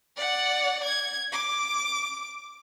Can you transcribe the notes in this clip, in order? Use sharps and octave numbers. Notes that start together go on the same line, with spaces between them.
D5 F#5
G#6
D6